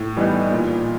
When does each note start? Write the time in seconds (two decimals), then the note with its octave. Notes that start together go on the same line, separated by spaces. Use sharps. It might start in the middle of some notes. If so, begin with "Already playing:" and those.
Already playing: A2
0.17 E3 G3 B3 D#4
0.51 A#2